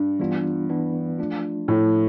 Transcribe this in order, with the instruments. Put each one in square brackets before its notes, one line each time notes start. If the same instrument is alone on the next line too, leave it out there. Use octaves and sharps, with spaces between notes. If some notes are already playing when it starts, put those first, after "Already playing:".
Already playing: [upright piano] G2
[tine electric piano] E3 G3 B3 D4 F4
E3 B3 D4
F3 A3 D4 F4
[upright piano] A2 [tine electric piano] F3 A3 E4